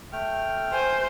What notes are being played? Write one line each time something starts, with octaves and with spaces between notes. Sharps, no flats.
A3 G5 F6
C5 G#5